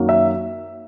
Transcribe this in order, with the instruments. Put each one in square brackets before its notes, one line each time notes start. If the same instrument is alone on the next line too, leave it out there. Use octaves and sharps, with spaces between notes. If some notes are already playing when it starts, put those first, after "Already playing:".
Already playing: [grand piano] F#2 D#3 F#3 A#3
E5